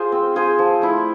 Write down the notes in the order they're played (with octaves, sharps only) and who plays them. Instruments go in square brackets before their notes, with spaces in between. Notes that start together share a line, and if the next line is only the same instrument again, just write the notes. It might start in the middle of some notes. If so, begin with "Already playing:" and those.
Already playing: [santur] F4 G#4 C5
C4
F4 G#4 C5
F3
A3 E4